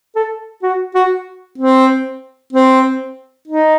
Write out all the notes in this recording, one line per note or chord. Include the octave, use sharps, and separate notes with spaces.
A4
F#4
F#4
C4
C4
D#4